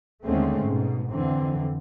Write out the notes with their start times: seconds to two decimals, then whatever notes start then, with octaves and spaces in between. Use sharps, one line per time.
0.24 D#2 D3 G#3 A3 C4 C#4
0.64 G#2 B2
1.09 F2 D3 E3 C4